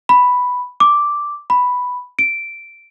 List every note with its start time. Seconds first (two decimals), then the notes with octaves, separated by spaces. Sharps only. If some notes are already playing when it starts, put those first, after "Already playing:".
0.09 B5
0.80 D6
1.50 B5
2.19 D7